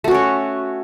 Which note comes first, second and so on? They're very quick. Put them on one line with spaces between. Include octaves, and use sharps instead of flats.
A3 F#4 C#4 C#5